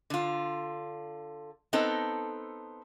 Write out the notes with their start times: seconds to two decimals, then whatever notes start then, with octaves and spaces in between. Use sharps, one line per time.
0.10 D3 F4
1.73 B3 C4 D#4 A4